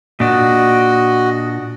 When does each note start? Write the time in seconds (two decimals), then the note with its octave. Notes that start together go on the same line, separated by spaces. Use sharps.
0.20 A#2 D4 F#4 D#5